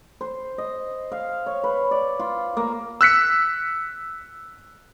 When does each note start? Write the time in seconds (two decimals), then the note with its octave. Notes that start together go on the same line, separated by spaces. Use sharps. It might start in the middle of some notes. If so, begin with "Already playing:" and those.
0.21 C5
0.58 D#5
1.12 F5
1.46 C#5
1.64 B4
1.91 D5
2.20 F4
2.57 A#3
3.01 E6 F#6 B6 C#7